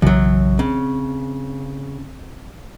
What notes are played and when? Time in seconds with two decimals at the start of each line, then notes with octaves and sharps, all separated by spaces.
0.02 B1 F#2 C#3 E3 F#3
0.59 C#3 C4